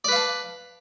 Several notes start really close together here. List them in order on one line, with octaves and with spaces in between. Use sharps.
D5 B4 F5 A5